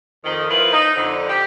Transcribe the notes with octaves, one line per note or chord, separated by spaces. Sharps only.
F2 D#3
F3 A#3 E4 F4 B4
D#4
F2 D3
G4